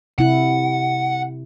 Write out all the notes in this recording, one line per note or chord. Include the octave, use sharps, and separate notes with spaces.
C3 E4 F#5